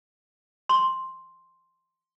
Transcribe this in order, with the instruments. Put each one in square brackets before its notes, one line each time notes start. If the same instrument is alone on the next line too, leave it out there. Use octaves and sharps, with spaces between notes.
[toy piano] C6